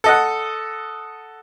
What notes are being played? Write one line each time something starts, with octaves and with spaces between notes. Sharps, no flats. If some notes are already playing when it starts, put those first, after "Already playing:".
A4 D#5 F#5